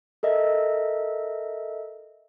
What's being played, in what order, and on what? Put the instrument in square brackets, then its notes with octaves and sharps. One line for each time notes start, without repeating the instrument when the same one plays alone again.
[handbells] A4 A#4 D#5 E5